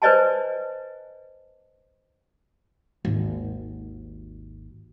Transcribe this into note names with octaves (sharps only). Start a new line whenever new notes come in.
B4 C5 D5 D#5 G#5 A5
G#1 D#2